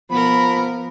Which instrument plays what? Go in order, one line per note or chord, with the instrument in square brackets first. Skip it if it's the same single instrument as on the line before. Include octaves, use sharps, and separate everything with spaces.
[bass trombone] F3 [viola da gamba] B3 A#4 [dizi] B5